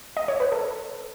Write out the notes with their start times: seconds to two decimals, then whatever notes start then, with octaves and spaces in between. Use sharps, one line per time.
0.17 D#5
0.28 C#5
0.40 B4
0.52 A4